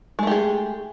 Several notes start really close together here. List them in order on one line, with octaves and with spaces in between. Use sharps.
G#3 A3 G4 G#4